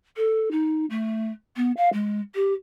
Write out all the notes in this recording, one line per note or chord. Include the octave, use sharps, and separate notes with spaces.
A4
D#4
A3
B3
F5
G#3
G4